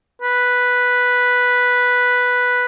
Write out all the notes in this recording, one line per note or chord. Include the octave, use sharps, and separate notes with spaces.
B4